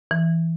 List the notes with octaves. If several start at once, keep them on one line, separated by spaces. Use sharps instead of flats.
E3